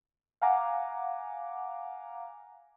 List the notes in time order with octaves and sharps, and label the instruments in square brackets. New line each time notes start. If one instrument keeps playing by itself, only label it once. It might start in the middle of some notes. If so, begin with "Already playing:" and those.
[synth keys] F5 F#5 G#5 A#5 D6